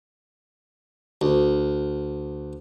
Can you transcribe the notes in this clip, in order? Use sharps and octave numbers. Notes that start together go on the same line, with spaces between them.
D2